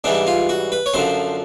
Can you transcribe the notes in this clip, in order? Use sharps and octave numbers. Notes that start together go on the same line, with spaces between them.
G#2 E3 G3 D4
F4
F#4
B4
C#5
F#2 D3 F3 C5